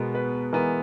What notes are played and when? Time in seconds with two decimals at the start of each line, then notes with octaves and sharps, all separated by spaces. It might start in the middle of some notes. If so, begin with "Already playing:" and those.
Already playing: B2 G#3 B3 A#4
0.15 B4
0.53 E3 G#3 B3 A#4